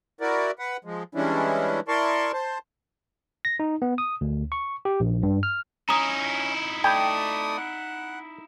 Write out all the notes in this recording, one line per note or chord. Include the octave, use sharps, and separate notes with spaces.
E4 F#4 A#4 D5
B4 F#5
F3 G#3
E3 G3 G#3 C#4 D4 E4
E4 A#4 D5 A5 C6 C#6
C5 A5
A#6
D#4
B3
D#6
D2
C#6
G4
A#1
G2
F6
C#4 D#4 E4 A#5 D#6
A3 D5 G5 B5 D#6 G#6
F#5